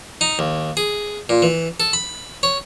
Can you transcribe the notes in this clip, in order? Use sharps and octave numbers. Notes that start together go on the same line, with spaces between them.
D#4
D#2
G#4
A#2
E3
A4
B5
C#5